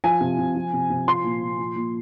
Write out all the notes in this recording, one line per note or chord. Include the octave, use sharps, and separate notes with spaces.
F3 G#5
C3
C3
F3
C3
C3
F3 C6
A#2
A#2
F3
A#2